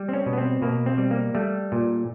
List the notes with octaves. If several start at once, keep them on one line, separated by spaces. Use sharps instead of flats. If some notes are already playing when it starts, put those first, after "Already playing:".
Already playing: G3
C4
C#4
B2
B3
C4
B2 A#3
C4
G3
A#3
G3 A3
A#2